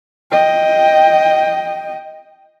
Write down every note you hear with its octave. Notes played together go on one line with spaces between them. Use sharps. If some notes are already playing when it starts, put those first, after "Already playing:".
D#5 G5